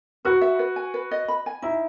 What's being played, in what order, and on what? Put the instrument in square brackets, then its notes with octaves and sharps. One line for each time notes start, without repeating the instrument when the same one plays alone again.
[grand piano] F#4 [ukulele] B4
[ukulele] E5
B4
G#5
B4
D#5
B5
G#5
[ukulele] D#4 [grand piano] E4